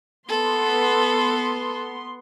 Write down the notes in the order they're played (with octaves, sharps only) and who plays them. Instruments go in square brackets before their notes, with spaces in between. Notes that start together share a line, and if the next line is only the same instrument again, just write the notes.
[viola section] B3 C6 [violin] A4